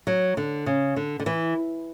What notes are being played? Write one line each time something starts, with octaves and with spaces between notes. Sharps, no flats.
F#3
D3
C#3
D3
D3
E3